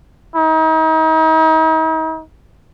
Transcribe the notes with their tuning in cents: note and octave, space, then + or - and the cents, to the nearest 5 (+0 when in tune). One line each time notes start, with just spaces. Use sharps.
D#4 +40